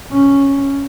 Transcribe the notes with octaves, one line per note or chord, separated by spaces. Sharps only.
C#4